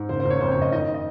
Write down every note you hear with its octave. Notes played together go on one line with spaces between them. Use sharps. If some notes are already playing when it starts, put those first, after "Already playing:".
Already playing: G#2
F#1 C5
C5
F#1
C#5
F2 C5
C#5
F#1 D#5
D#3 D#5
D#5